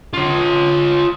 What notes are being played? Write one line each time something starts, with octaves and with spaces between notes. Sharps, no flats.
F4 C#5